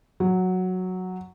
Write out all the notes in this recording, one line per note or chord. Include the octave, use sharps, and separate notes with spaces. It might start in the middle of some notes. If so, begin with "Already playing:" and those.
F#3